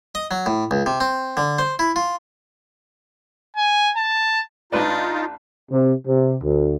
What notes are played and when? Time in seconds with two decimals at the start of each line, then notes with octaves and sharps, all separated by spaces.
0.15 D#5
0.31 F#3
0.46 A2
0.71 C#2
0.86 C3
1.00 C4
1.37 D3
1.59 C5
1.79 E4
1.96 F4
3.56 G#5
3.97 A5
4.72 A1 D4 D#4 F4 B4 D5
5.71 C3
6.06 C3
6.44 D2